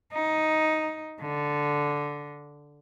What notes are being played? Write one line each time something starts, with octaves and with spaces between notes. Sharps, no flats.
D#4
D3